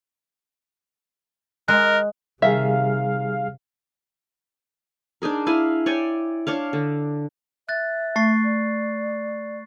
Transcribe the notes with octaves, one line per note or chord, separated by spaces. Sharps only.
G#3 A#4 F#6
C3 D#3 G3 G#4 E5 F5
D4 D#4 G#4 A#4
E4 F5 G#5
C#5 D5 G5 G#5
D4 C#5 F5
D3
E5 F#6 A6
A3 C#6 A6 C7
D5